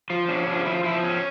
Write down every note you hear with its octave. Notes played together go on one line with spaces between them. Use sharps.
F3 F4
C#4 D4
F3 D4
F3 E4
F4
F3 E4
C#4